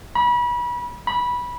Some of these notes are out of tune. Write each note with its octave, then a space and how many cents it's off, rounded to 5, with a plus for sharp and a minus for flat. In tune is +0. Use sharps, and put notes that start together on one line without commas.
B5 -30
B5 -15